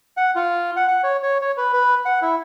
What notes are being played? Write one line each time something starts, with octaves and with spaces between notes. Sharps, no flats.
F#5
F4
F#5
F#5
C#5
C#5
C#5
B4
B4
F#5
E4